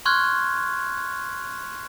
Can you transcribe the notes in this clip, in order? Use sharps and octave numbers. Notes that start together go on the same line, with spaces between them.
C6 C#6 F6 F#6 G#6